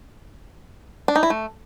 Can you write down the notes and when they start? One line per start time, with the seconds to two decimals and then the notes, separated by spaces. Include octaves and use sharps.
1.08 D4
1.16 D#4
1.23 E4
1.30 A3